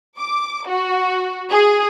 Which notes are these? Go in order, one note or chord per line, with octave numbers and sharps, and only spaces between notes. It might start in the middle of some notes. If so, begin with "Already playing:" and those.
D6
F#4
G#4